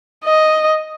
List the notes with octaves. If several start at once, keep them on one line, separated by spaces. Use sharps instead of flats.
D#5